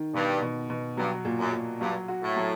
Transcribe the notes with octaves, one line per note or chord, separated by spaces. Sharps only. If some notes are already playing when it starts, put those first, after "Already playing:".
Already playing: D#3
G2 B2
B2
B2
G2 F#3
A#2
F#2
A#2
G2 F#3
F#4
A2
F#3